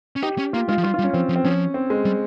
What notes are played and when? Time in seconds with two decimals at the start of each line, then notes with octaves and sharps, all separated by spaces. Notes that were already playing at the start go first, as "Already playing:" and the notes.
0.16 C#4
0.22 D#4 G4
0.38 C#4
0.53 A#3 F4
0.69 G#3 F4
0.78 F3
0.84 G3 F4
0.94 F4
0.99 G3
1.04 C#4
1.13 F3 C4
1.29 F3
1.36 C4
1.45 F3 C#4
1.74 C4
1.90 G#3
2.05 G3